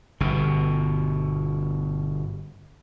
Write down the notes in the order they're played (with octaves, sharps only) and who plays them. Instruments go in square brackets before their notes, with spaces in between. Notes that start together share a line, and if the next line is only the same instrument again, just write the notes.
[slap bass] G1 B2